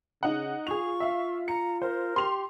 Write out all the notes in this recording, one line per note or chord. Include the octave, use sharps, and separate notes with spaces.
C#3 D#4 F#5
F4 G#4 C#6 F7
E5 F5
A#5 C#7
A#4 C5
G4 C6 F7